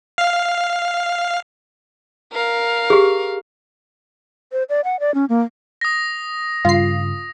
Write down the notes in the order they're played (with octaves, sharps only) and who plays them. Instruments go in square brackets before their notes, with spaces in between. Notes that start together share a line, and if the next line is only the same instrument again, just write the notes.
[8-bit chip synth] F5
[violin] A#4 F5
[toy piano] G4 G#4
[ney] C5
D5
F#5
D5
C#4
A#3
[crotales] D#6 A#6
[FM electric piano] G2 C#3 [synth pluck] F4 C7